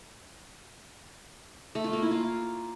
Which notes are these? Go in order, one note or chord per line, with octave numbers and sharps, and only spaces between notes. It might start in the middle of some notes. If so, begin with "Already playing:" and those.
A3
F4
A#3
E4
F4